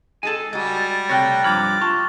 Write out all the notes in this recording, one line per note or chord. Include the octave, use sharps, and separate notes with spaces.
G#3 G#4 A4 G#5 A5
G3 G#3 F#4 A6
C3 A3 C#5 G5 F#6 A#6
G2 F3 A#5 B5 D6 F6 G#6 A6
F4 A5 C#6